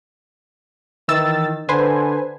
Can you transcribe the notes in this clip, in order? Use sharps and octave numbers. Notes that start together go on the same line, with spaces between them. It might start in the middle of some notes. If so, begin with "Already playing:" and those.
D#3 E3 E6 A6
D3 B4 C5 G#5